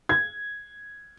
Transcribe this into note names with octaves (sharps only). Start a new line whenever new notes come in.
G#6